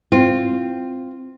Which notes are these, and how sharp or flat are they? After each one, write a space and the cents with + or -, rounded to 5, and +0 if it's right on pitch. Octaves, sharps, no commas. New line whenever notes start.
C4 +0 F4 +0